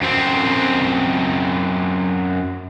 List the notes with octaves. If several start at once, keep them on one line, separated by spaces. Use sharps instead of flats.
F#2 C4